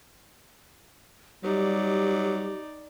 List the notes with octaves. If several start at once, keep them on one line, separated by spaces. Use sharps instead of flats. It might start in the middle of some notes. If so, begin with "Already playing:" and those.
F#3 G3 D#4 G4 D5